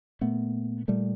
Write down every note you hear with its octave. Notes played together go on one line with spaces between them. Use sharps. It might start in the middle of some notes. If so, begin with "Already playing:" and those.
A#2 A3 B3
A#2 G3 A3